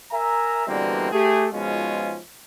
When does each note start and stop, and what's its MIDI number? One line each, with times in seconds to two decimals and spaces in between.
0.12 0.65 70
0.12 0.65 76
0.12 0.65 80
0.12 0.65 82
0.67 1.11 47
0.67 1.11 50
0.67 1.11 52
0.67 1.11 55
0.67 1.11 58
0.67 1.11 60
1.12 1.46 57
1.12 1.46 67
1.12 1.46 68
1.52 2.18 44
1.52 2.18 47
1.52 2.18 53
1.52 2.18 56
1.52 2.18 61
1.52 2.18 65